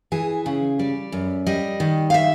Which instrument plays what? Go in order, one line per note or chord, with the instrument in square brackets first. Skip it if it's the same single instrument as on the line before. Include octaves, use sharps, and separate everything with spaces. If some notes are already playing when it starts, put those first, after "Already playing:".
[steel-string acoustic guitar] E3 G#4
C#3
G3 D5
F#2
G3 D#5
D#3
F5
E5